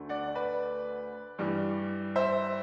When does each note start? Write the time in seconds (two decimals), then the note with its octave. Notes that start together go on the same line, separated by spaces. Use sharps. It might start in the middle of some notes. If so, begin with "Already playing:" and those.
Already playing: D2 D3 A3
0.09 D5 F#5
0.35 B4 D5
1.38 G2 E3 G3
2.16 C5 E5